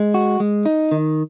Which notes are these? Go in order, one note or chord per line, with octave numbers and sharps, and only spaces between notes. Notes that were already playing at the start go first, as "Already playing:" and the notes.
Already playing: G#3
F#4
G#3
D#4
D#3